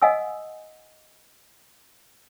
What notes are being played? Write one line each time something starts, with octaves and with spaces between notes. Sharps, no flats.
D#5 F5 F#5 G#5 D#6 E6